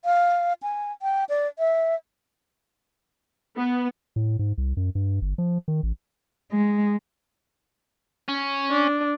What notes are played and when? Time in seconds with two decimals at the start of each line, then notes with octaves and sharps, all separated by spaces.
0.05 F5
0.63 G#5
1.02 G5
1.29 D5
1.59 E5
3.57 B3
4.16 A2
4.39 G#2
4.58 C2
4.77 F#2
4.95 G2
5.22 G1
5.38 F3
5.68 D#3
5.83 A1
6.52 G#3
8.28 C#4
8.71 D4